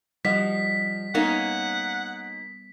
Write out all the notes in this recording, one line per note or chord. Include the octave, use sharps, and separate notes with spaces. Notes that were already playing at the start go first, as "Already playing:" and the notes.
F3 G3 D#5 F#5 B6
A#3 B3 C#4 D#4 F#5